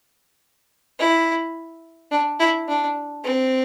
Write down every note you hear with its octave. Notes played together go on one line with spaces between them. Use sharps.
E4
D4
E4
D4
C4